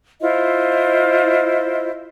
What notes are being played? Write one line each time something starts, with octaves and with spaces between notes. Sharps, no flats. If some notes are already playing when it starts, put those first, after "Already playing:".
E4 F4 C5 D#5